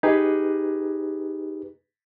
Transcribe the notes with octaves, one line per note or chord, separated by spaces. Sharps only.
D#4 G4 G#4 B4